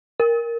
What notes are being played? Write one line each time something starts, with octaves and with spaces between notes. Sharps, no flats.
A#4